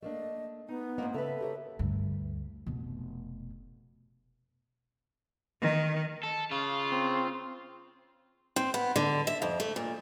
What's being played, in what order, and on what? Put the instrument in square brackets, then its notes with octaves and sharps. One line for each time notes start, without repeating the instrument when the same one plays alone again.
[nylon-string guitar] A3 A#3 D4 [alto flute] D#5
[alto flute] B3 [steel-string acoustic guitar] D#4
[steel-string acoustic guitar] G#2 F4 F#5 [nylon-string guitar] A#3 C4 D#5
[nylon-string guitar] C#3 [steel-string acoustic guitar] A4 B4 [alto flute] E5
[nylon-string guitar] G4 A#4 C#5
[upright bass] D2 G2
F1 B2
[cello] D#3
[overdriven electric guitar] A4
[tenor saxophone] C#3 [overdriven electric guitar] F4
[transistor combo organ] C4
[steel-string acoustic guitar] C4
B3
D3
E5
F2
A3
A#2